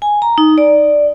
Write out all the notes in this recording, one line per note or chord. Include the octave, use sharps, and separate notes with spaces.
G#5
A#5
D#4
D5